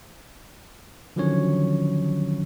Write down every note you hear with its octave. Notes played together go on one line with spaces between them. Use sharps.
D3 D#3 F3 F#3 C#4 C#5